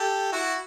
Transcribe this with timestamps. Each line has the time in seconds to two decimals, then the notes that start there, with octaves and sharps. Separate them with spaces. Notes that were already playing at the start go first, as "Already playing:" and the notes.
Already playing: G4 A4
0.32 E4 F#4